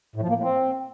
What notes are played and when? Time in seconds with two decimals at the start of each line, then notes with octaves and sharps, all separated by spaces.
0.16 A2
0.22 F3
0.29 A#3
0.36 A2
0.43 C4